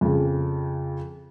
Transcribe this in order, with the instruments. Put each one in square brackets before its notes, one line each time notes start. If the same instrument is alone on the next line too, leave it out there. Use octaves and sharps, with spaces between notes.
[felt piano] F2 C#3